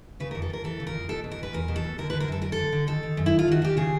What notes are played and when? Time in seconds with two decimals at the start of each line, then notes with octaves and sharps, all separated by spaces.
0.20 C#3 B4
0.31 F2 A#4
0.42 A4
0.50 F2 A#4
0.64 E3 A4
0.80 C#3
0.87 A#4
0.94 F2
1.09 B2 A4
1.24 B2
1.31 A#4
1.39 E2 B4
1.53 E2 A#4
1.68 B2
1.76 A4
1.84 B2
1.98 D3 A#4
2.10 D3 B4
2.20 A#4
2.28 F#2 A4
2.42 F#2 A#4
2.52 A4
2.58 D3
2.72 D3
2.87 D#3 A4
3.03 D#3
3.17 F#2
3.26 E4
3.32 F#2
3.39 F4
3.48 D#3 F#4
3.62 D#3 G4
3.77 C#3 G#4